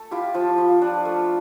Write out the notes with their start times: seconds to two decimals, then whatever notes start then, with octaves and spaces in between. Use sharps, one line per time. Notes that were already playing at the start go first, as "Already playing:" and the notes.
Already playing: A3 A4
0.11 E4 F4 G4
0.34 F3 F4
0.58 F4
0.82 D4
1.05 A3